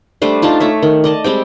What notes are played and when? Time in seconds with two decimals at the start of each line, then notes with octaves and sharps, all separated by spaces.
0.22 G3 A3 D4 C5
0.42 D4 D#4 F4 A5
0.60 A3 C#5 E5
0.82 D#3
1.04 D5 D#5 A5
1.24 G3 G#3 C4 G5